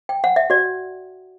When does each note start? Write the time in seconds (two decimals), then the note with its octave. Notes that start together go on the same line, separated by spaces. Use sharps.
0.09 G5
0.24 F#5
0.36 E5
0.50 F#4 D5